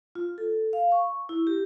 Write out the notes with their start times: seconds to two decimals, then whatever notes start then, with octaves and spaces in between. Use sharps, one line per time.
0.15 F4
0.38 A4
0.73 F5
0.92 C#6
1.29 E4
1.47 G4